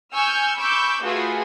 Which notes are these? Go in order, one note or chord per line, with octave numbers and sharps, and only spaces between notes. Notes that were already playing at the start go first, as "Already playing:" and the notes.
G#5 C#6 E6 F6 G6
B5 C#6 D6 E6 G6
A3 F4 F#4 G#4 B4